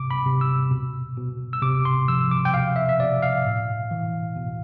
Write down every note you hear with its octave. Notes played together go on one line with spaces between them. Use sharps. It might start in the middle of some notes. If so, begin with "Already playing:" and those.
Already playing: C3 D6
B5
C3
E6
B2
B2
E6
C3 D6
C6
F3 E6
D6
G5
B2 F5
E5
E5
B2 D5
F5
A2
E3
B2